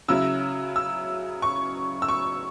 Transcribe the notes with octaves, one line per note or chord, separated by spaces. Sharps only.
C#3 F#3 E4 E6
E6
C#6
E6
C#6